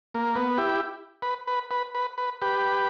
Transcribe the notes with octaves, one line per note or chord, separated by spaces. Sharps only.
A#3
B3
E4 G4
B4
B4
B4
B4
B4
G4 B4